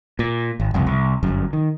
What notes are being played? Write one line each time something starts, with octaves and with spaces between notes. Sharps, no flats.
A#2
G#1
F#1 C2 F2
C2
G1 F#2
D#3